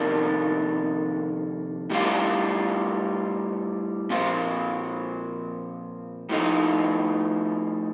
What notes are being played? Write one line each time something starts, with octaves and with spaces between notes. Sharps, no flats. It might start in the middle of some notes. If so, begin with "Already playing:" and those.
Already playing: F2 C3 D#3 A#3 D4
A2 G3 D4 F4
A#2 F3 C4 F4
A2 F3 A3 D#4